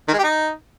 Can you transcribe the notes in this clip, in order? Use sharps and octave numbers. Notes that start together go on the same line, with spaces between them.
D#3
G#3
G4
D#4